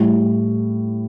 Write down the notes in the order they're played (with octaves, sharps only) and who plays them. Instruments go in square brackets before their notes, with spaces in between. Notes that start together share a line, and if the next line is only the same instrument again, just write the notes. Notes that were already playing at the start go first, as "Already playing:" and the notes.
Already playing: [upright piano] A2 G3